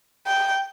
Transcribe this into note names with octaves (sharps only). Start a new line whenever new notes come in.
G5